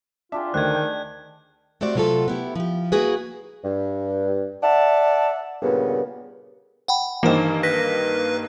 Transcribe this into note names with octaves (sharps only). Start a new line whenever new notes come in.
D4 F4 G4 G#4 E5
D2 D#3 A3 C5 F#6 G#6
G6
A3 C4 F#4 G4 D5
C3 F#3 A3 F4 F#4 A4
B3 E4 G4
F3 G4
A#3 E4 F#4 G#4 B4
G2
D5 E5 F#5 A5
G2 A#2 C#3 B3
F#5 G5 B5
G2 D#3 E3 A#3 C5
B4 A#6 B6